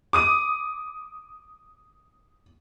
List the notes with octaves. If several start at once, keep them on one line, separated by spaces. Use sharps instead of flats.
D6 D#6 D#7